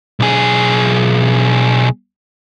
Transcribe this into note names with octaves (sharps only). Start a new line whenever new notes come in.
B1 G#4